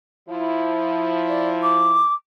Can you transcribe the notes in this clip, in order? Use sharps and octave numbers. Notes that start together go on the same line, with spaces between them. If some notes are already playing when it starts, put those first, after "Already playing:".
F3 E4
D5
D6